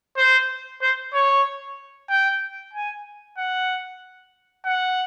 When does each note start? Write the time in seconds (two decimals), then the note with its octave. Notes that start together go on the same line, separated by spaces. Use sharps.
0.17 C5
0.82 C5
1.14 C#5
2.09 G5
2.73 G#5
3.38 F#5
4.65 F#5